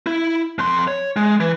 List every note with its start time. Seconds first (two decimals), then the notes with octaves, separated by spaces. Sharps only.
0.06 E4
0.59 F2 C6
0.88 C#5
1.16 G#3
1.40 E3